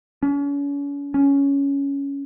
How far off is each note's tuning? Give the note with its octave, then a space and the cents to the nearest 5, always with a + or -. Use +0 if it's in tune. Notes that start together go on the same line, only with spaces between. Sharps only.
C#4 +40
C#4 +10